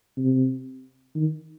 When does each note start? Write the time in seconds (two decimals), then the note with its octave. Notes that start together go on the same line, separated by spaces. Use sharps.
0.17 C3
1.16 D#3